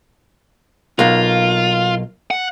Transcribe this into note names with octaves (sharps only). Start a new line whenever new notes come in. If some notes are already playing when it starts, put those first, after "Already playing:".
B1 A#3 F4
F#5